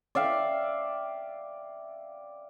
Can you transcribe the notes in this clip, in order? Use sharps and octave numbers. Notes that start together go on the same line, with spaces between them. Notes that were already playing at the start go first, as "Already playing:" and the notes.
D5 E5 F5 G5